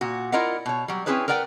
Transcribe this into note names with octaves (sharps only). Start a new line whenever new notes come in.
A#2 F#4
E4 F4 A#4 D5 D#5 F#5
B2 C#5
F#3 G3
C4 C#4 E4 G#4 B4 C#5
A#4 B4 D5 F#5 G5